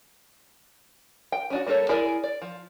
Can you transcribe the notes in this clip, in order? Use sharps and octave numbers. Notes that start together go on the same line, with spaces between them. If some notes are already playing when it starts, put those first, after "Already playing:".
G5
C#4 D4 F#4
G3 A#3 F4 A4 C#5
E4 G#4 A#4 D5
D5
F3